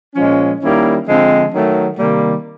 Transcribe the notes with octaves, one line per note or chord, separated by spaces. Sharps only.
A#2 F3 G#3 C#4
D#3 G3 A#3 C#4 E4
D3 F3 G#3 C4
D#3 F#3 A3
C3 D#3 G3 A#3